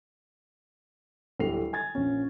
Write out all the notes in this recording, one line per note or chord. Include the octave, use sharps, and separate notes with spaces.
D1 G3 A3 C7 F7
G#5 G#6 A6
A#1 C#4